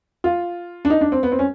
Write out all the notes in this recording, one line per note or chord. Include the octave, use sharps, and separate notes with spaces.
F4
D4
D#4
D4
C4
B3
C4
C#4